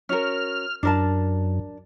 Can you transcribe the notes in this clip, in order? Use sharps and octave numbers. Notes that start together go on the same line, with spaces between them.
C#4 F#4 A#4 F6
F#2 D4 A#4 A5